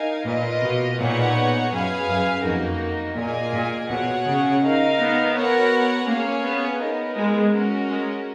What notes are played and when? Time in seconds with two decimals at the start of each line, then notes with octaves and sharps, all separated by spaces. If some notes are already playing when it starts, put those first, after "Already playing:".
Already playing: D#4 A#4 F5 G#5
0.26 A#2 A#3 F4 B4 D#5
0.62 B2
0.98 A#2 B3 D#4 G#4 C#5 F#5
1.71 F#2 G#4 B4 F5 G#5
2.07 F#2
2.44 F2 A#3 D#4 F#4 A#4
3.16 A#2 A#3 F4 G#4 D#5 G#5
3.53 A#2
3.89 B2 G#4 C#5 F#5
4.26 C#3
4.62 D#4 A#4 F5
4.98 B3
5.34 B3 F#4 A#4 C#5 F#5
6.07 A#3 C#4 G#4 C#5 F5
6.44 B3
6.80 B3 D#4 A#4
7.16 G#3
7.53 C#4 F#4 A#4
7.89 G#3